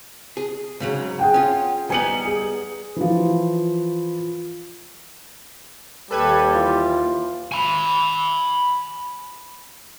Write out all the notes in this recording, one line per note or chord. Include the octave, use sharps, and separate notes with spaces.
G#4
G#2 C#3 F#3
G#4 F#5 G5
C#4 F4
G3 B3 D#4 G#5 C#7 F#7
G#4
E3 F3
D#2 G3 A4 B4 G#6
E3 F4
G#5 B5